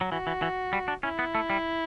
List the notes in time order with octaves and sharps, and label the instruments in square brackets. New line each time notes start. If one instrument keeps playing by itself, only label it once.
[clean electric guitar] F#3
[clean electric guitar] E3 [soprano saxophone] F#4
[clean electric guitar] E3
E3
G3
D4
[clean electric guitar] C#4 [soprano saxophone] E4
[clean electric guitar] B3
A3
G3